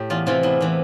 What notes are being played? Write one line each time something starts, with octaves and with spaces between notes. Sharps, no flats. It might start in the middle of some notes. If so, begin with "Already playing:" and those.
Already playing: A2 G4
E2 F4
C3 E3 F4
E2 E4
C3 E3